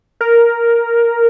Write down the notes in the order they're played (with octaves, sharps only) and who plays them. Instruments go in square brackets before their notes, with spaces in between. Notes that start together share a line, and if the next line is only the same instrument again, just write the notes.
[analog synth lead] A#4